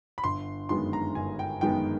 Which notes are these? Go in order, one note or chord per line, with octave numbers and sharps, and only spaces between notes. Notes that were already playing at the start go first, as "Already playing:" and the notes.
B5
G1 C6
F#2 D#3 G#3 B3 C6
A#5
G1 G#5
G5
F#2 D#3 G#3 B3 G5